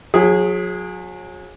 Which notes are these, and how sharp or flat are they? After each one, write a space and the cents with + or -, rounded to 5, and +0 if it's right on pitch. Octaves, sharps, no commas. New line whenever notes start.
F#3 -35 G#4 +0